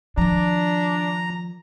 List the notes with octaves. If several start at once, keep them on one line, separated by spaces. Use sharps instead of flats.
D#3 F3 D4 A#5